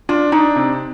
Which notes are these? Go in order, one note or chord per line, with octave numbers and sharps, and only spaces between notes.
D4 F4
D4 D#4
C3